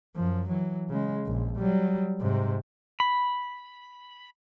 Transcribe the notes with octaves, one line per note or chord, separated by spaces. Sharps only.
F#2 F3
E3 F#3
C#3 G#3
A#1
F#3 G3
G#2 C3
B5